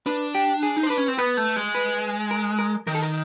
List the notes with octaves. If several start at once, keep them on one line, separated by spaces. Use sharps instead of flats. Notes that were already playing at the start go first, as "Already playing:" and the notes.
D4 B4
G4
G#4
D#4
C5
D4 B4
C#4
C4
B3 B4
A3
G#3
B4
A#4
A#4
D#3 A#4
A4
A#4